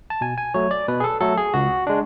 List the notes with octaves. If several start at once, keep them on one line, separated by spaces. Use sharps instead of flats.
A5
B2 G#5
G#5
F#3 A3 C#5
D5
B2 B4
G#4
A4
F#3 A3 A4
G#4
C#2 F#4
G#3 D4